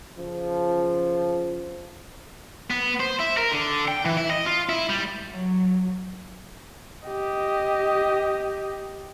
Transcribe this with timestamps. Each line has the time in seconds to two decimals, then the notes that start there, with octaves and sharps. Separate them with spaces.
0.18 C#3 F3
2.71 B3
3.00 C5
3.20 E4
3.38 A#4
3.51 D3
3.88 G5
4.05 E3
4.17 E4
4.31 D#5
4.46 F4
4.69 E4
4.89 G3
5.30 F#3
7.08 G4 D#5